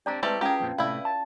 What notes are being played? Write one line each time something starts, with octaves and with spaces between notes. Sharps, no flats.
C4 D4 G4 D5 A#5
G#3 A3 C4 E4 G4 B4 D5 A5
C#4 F4 G4 G#4 A#4 F5
F2 A#2 C4
A2 C3 A3 E4 B4 D5 F5
A5